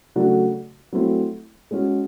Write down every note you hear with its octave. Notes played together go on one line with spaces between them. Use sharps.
C#3 F#3 A3 D4 F#4
F#3 A3 C4 E4
G#3 C#4 F#4